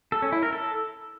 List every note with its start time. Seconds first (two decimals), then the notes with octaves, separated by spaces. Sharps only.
0.12 A4
0.22 C#4
0.32 E4
0.43 A#4
0.53 A4